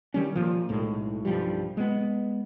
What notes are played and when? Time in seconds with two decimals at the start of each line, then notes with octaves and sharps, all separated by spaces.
0.14 D#3 G3 C#4
0.35 A#2 F3
0.69 B1 A2 G#3
1.25 B1 G2 F3 G3
1.77 G#3 B3